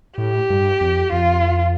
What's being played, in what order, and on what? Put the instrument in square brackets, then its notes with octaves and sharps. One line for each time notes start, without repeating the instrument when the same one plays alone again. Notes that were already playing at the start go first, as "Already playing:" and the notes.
[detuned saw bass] A2 [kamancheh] G4
[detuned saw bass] G2
F2
[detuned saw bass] F2 [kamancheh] F4